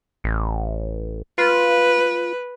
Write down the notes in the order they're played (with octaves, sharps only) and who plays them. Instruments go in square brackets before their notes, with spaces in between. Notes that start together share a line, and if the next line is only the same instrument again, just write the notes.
[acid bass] A1
[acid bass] F4 [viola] B4